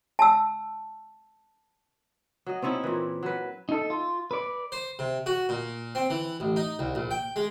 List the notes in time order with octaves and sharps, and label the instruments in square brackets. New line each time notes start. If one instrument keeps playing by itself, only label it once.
[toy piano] A5 E6
[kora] F#3 D#5
C4 C#4 D#4 E4
A#2 E3
F#3 B4
[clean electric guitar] D#4 A4
F4
B4 D5
[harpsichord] C5
C3
F#4
A#2
C4
E3
A1
D#4
C2
A#1
G5
G#3